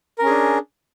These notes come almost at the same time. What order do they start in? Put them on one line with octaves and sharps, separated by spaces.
A#4 C#4 G#4 D4